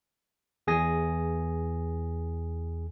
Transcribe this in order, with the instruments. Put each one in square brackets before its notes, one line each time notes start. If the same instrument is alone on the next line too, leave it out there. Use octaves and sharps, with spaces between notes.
[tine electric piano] E2 G#4 G#5 A#6